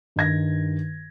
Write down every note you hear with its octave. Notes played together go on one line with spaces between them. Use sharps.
G2 D#3 G#6 A#6